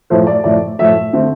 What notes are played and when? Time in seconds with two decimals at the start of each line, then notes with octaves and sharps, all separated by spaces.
0.10 A2 F3 A3 C5
0.27 D5
0.44 A2 F3 A3 D5
0.79 A2 F3 A3 E5
1.13 D3 A3 C4